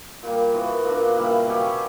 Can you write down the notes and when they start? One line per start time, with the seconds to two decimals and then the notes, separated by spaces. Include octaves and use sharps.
0.23 A#2 G3 A#3
0.54 E3 B3 F#4
0.84 A#2 A#3 D4
1.16 C#3 G3 A#3 E4
1.46 B2 F#3 C#4 G4